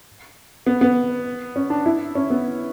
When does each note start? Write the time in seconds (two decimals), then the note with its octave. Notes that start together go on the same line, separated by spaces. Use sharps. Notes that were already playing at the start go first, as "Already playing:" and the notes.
0.67 B3
0.81 B3
1.56 C#4
1.70 D4
1.86 E4
2.15 C#4
2.30 B3